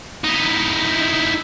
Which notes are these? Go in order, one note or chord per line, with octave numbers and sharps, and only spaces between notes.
D#4 E4